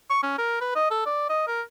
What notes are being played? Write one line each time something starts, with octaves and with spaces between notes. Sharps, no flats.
C#6
C#4
A#4
B4
D#5
A4
D5
D#5
A#4